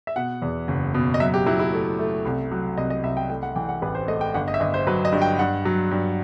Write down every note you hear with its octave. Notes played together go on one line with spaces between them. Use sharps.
E5
B2 F#5
E2
F#1
B2
D#5
F#3 E5
G4
F#3 E4
E4
A3
A3
C2
F#3
C2 D#5
D#5
C2 E5
G5
A3 G5
F#5
E3 G5
F#5
A1 B4
C5
A3 D#5
G5
G1 F#5
D#5
E5
G1 D#5
C5
F#3 B4
D#5
G2
G5
G2 F#5
F#3
G2